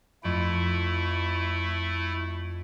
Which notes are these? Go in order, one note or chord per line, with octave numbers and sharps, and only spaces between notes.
F2 A3 E4 D7